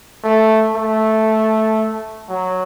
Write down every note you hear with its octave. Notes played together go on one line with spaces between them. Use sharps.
A3
A3
F#3